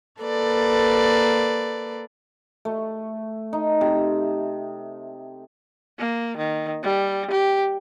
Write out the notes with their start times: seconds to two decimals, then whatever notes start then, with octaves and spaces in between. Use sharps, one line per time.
0.20 A#3 A4 B4 D5
2.65 A3
3.53 D#4
3.81 C3
5.99 A#3
6.37 D#3
6.83 G3
7.31 G4